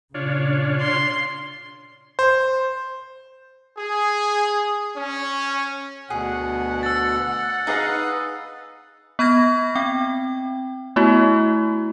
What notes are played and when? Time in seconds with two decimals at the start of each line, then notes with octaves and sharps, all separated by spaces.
0.14 A#2 C#3 D4 F4 C#5
0.81 C6
2.19 C5
3.78 G#4
4.96 C#4
6.10 D2 B2 G#4 F#5
6.83 E6 A6
7.67 D#4 G#4 B4 D#5 F5
9.19 B3 B5 F6 G#6 A#6
9.75 C4 G5
10.96 A3 B3 E4 F#4